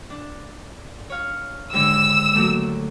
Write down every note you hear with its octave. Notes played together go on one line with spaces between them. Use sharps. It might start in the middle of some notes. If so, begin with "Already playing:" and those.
D4
C#5 F5
D#2 G#2 D3 E6
F#3 A3 A#3